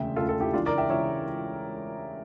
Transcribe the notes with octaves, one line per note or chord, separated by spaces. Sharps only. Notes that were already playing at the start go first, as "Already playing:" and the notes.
Already playing: E1 D2 C#3 E5 G5
E1 D2 C#3 F4 A4
F4 A4
E4 G4
C#2 C#3 E3 D4 F4
A#4 D5
E5 G5
C#2 C#3 E3 C#5 E5